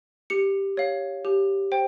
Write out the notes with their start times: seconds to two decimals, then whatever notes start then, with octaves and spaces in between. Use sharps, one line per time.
0.30 G4 C#7
0.77 C#5 F5
1.25 G4
1.72 C5 G5